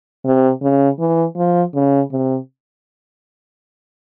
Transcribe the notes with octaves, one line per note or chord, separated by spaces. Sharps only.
C3
C#3
E3
F3
C#3
C3